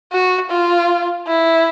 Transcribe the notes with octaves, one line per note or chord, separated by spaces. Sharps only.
F#4
F4
E4